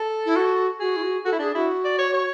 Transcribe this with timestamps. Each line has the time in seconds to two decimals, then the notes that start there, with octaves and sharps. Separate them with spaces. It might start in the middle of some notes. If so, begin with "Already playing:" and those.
Already playing: A4
0.26 E4
0.36 F#4
0.79 F#4 G#4
0.96 E4
1.02 F#4
1.25 F#4 A4
1.32 E4
1.39 D4 G#4
1.55 E4 F#4
1.84 D5
1.99 C#5
2.14 C#5